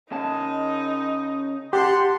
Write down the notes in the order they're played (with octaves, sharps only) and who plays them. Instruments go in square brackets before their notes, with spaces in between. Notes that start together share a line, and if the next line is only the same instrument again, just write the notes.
[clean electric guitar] C#3 A5 [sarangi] D#4
[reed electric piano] G4 [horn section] F#5 A5 C6